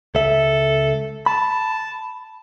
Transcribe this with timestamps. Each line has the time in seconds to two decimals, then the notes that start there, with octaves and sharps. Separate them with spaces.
0.15 C#2 A4 E5
1.26 A5 B5